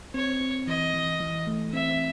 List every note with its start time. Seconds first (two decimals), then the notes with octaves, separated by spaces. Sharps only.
0.14 C4 C#5
0.41 C4
0.67 E3 D#5
0.94 E3
1.20 E3
1.47 A3
1.73 C4 E5